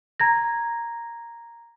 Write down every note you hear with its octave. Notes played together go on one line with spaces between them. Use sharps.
A#5 G#6 A#6